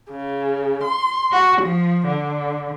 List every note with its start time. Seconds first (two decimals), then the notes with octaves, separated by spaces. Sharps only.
0.11 C#3
0.85 C6
1.31 F#4
1.61 F3
2.06 D3